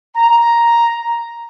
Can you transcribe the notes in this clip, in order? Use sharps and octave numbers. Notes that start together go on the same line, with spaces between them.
A#5